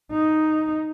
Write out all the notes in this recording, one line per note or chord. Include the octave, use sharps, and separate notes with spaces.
D#4